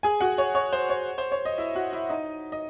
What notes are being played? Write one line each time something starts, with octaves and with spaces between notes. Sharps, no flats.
G#4 G#5
F#4 F#5
C#5
C#5
C5
C#5
C5
C#5
D#5
E4 E5
F#4 F#5
E4 E5
D#4 D#5
D#5